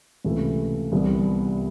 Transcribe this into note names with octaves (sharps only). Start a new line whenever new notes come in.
C#2 C3 E3 A3
C2 C3 E3 G3 B3